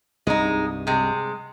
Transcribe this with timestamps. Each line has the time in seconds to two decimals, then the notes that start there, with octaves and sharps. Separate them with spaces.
0.27 C2 G2 G#3 D#4
0.87 C3 G#3